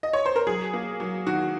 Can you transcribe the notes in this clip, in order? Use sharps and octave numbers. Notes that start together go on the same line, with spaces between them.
D#5
C#5
C5
A#4
F#3 G#4
A#3
F#3
D#3 F#4